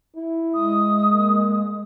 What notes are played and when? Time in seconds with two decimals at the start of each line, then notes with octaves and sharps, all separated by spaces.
0.16 E4
0.54 G#3 D#6
1.10 A#3